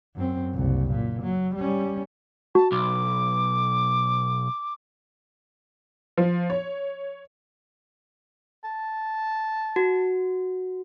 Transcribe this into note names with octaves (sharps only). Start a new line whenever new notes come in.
F#2 C4
F#1 C2
A#2
F#3
G3 C#4
F#4 A5
B1 D6
F3
C#5
A5
F#4